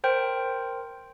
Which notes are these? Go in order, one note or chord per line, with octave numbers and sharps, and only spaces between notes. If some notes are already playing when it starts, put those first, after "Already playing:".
A#4 C5 G5